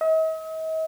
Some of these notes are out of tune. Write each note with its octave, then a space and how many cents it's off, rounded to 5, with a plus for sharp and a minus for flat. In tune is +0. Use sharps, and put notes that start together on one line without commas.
D#5 +45